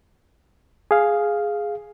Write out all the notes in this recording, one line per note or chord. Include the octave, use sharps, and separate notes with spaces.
G#4 F5